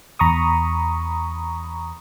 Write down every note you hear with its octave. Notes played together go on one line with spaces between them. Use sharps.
E2 A#5 B5 C#6 D#6